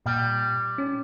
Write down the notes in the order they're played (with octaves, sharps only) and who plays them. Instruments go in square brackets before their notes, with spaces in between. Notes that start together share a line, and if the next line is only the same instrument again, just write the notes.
[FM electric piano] A#2 G5 [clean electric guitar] G3
[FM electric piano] C#4